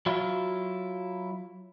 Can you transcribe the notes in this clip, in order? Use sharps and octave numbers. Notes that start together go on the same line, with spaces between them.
F#3 E4 F4